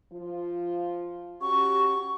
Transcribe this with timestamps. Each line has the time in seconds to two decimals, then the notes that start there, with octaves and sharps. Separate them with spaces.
0.12 F3 F4
1.42 C#4 F#4 G4 C#6